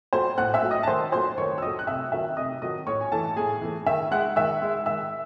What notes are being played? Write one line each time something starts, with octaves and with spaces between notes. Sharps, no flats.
F#3 A3 C5 C6
A2 F#5 F#6
E5 E6
F#3 A3
D#5 D#6
A5
D#3 C5 C6
F#3 A3 C5 C6
D#3 C#5 C#6
E6
F#3 A3 D#5 D#6
F#6
C3 E5 E6
D#3 F#3 A3 E5 E6
C3 D#5 D#6
D#3 F#3 A3 D#5 D#6
A2 C#5 C#6
G#5
E3 A3 A4 A5
A2 G#4 G#5
E3 A3
D#3 E5 E6
G#3 F#5 F#6
D#3 E5 E6
G#3
D#3 E5 E6